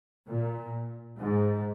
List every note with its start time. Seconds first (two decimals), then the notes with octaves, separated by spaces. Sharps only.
0.27 A#2
1.18 G#2